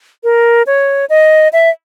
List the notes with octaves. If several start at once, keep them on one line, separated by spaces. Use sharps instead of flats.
A#4
C#5
D#5
E5